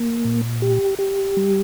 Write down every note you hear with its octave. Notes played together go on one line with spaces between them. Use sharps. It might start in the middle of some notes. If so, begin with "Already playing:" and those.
Already playing: A#3
A#2
G4
G4
G3